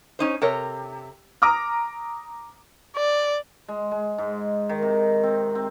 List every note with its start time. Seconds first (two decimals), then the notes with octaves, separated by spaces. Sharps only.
0.19 C#4 D#4 C5
0.42 C3 A4 A#4 C#5
1.42 A#5 D6 D#6 F6
2.96 D5
3.68 G#3
3.91 G#3
4.18 G#2
4.69 D#3
4.82 C3
5.23 C4
5.55 C4